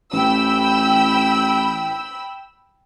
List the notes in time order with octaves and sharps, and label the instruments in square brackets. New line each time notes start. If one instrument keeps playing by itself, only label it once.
[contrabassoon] A1 [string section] G5 B5 E6